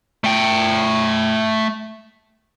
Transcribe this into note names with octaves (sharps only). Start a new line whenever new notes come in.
A3 G5